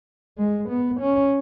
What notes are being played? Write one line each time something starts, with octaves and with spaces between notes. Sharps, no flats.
G#3
B3
C#4